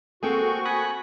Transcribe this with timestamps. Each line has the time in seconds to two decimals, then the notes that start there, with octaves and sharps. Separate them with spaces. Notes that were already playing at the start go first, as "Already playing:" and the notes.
0.23 A#3 C4 F#4 G#4 A4 G5 C#6
0.65 G#5 B5 D#6 F#6